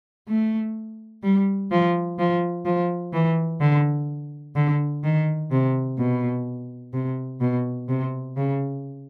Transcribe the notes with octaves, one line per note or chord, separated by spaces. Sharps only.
A3
G3
F3
F3
F3
E3
D3
D3
D#3
C3
B2
C3
B2
C3
C#3